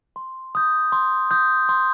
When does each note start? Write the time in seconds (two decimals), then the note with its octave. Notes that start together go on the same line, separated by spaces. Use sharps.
0.16 C6
0.55 D#6 G6
0.92 C6
1.31 D#6 G6
1.69 C6